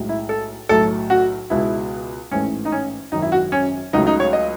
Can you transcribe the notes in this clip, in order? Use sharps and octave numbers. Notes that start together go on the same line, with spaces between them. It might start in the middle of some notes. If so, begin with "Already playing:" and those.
Already playing: B1 A2 G#3
E4
A4
B1 A2 F#3 A3 A4
F#4
C#2 B2 G#3 E4
A1 G#2 E3 A3 C#4
D#4
C#4
G#1 F#2 D#3 D#4
E4
F#4
C#4
C#2 C#3 F#3 A3 D#4
D#4
C#5
D#5